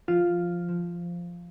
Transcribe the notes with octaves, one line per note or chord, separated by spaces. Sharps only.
F3 F4
F3